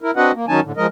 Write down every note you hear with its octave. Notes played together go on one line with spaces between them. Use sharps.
E4 A#4
C4 D4 F#4 B4 D#5 F#5
A#3
D#3 F#3 C#4 D#4 G#5 A5
A2 D3
F3 G#3 A#4 D#5